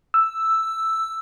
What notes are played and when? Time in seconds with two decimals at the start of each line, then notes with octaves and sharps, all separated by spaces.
0.14 E6